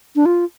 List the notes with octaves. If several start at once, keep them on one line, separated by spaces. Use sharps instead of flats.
D4
F4